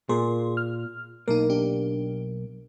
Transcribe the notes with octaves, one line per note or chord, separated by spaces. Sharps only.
A#2 G#4 A#4 C6
F6
B1 A#3 D#4 A#4
D4 G4